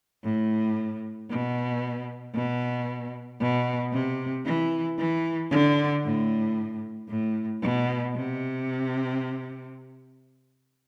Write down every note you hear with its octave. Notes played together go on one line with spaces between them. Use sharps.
A2
B2
B2
B2
C3
E3
E3
D3
A2
A2
B2
C3